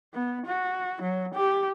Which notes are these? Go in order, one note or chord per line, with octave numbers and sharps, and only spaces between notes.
B3
F#4
F#3
G4